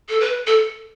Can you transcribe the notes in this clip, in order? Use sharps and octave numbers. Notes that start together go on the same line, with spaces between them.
A4
B4
A4